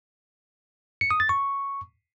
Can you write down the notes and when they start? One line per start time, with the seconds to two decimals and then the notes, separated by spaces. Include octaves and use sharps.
1.01 C#7
1.11 D#6
1.20 A6
1.29 C#6